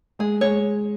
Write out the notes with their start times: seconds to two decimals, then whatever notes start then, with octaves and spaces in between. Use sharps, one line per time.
0.19 G#3 G#4
0.41 G#3 C#5